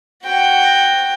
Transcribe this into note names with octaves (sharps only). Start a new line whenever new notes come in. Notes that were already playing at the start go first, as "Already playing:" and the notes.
F#4 G5